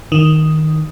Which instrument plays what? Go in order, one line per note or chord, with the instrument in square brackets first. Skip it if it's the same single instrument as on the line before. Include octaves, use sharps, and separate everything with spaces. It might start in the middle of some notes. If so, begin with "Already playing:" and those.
[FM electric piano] D#3